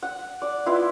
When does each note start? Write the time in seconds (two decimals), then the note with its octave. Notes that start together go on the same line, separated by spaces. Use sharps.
0.03 F#5
0.42 D5
0.66 B3 E4 F4